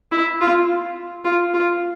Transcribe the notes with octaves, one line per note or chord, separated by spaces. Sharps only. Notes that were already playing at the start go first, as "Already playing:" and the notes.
E4
F4
F4
F4